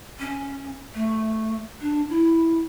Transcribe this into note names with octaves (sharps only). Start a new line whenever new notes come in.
C#4
A3
D4
E4